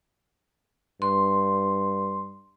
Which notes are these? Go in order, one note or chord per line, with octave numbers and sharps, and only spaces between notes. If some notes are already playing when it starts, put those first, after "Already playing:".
G2 C6